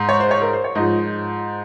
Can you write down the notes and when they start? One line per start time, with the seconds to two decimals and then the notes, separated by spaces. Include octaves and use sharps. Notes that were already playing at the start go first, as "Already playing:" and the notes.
Already playing: G#2
0.09 C#5
0.20 C5
0.31 C#5
0.42 A#4
0.53 C5
0.64 C#5
0.75 G#2 F3 D#5